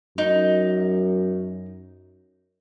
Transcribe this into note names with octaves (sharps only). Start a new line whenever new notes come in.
F#2 D#4